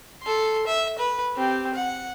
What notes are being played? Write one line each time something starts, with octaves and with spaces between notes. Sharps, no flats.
A4 C6
E5
B4
C4 G4
F#5